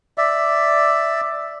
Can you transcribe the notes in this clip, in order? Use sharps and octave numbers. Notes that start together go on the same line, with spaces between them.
D5 E5